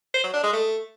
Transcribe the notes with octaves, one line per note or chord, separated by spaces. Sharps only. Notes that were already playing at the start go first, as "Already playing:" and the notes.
C5
F#3
D4
G#3
A3